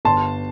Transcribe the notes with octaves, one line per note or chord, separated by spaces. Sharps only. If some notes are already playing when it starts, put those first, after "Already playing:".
G1 A5 C6